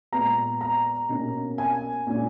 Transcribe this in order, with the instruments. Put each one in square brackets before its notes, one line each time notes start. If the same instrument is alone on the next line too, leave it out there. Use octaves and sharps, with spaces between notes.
[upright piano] A#2 G#3 B3 A#5
A#5
B2 A#3 C#4
G#5
A#2 G#3 C#4